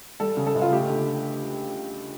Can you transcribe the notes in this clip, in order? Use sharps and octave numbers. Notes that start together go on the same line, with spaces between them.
G3 A4
C#3
A4
C#2
F4
A3 G4
D3